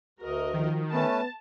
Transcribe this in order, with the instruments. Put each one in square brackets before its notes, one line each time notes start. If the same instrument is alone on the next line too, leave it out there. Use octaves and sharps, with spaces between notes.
[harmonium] D2 [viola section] F#4 A#4 D#5
[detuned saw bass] D#3 [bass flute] F3
[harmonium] A3 C#4 B4 [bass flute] B3 [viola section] A5